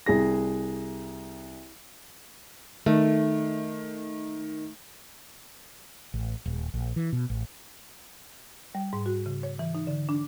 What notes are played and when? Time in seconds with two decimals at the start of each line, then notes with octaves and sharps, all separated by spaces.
0.06 C2 G#4 A#6
2.86 D#3 A3
6.14 A1
6.45 D#1
6.74 A#1
6.96 E3
7.12 B2
7.30 A1
8.75 G3
8.93 G#2
9.06 F#4
9.26 C#3
9.43 C#5
9.59 E3
9.75 D#4
9.87 D3
10.09 D4